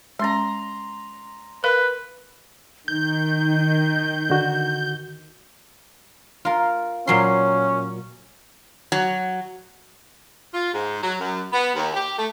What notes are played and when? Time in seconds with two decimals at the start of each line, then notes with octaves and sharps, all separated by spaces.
0.19 G#3 C#4 A#5 C6
1.64 A#4 B4 F5
2.88 D#3 D#4 G6
4.30 D3 F#4
6.45 F4 A#4
7.07 A#2 F#3 C#4 C6
8.92 F#3
10.53 F4
10.74 G#2
11.02 F#3
11.19 F#2
11.52 B3
11.75 D#2
11.94 G4
12.18 A3